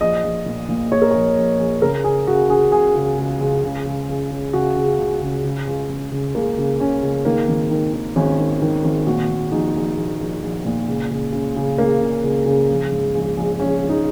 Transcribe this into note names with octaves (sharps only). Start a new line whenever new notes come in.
A#1 D#5
A#1
A#2
A#2
A#2 C#5
A#4
A#1 C#5
A#1
A#1
C#3 A#4
C#3 G#4
C#3 F#4
C#3 G#4
C#2 G#4
C#3
C#2
C#2
C#3
C#2
C#2
C#3
C#3 F#4
C#3
C#2
C#3
C#3
C#2
C#2
C#3
C#2 A#3
C#3
C#3 C#4
C#2
D#3 A#3
G#1
D#3
D#3
G#1 C#4
D#3
D#3
G#1
A#2 F#4
A#2
A#1 D#4
A#1
A#1
A#1
A#1
A#2
C#2
C#2
C#3
C#3
C#3 A#3
C#3
C#2
C#3
A#1
G#2
A#1
A#1
A#1 C#4
A#1
D#4